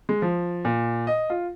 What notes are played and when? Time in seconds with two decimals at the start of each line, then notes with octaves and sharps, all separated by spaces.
0.09 G#3
0.22 F3
0.65 A#2
1.07 D#5
1.30 F4